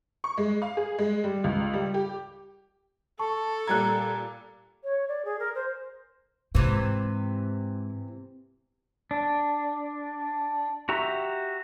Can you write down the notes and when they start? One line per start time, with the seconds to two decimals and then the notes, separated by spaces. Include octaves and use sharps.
0.24 C#6
0.38 G#3
0.62 F5
0.77 G#4
0.99 G#3
1.24 G3
1.44 C#2
1.73 G3
1.94 G4
3.19 A4 A5 C#6
3.68 A#2 G3 A#5 F#6 G#6
4.83 C#5
5.08 D5
5.24 G#4
5.39 A#4
5.55 C5
6.55 G#2 C3 E3
9.11 D4
10.89 F#4 G4 E5 A#5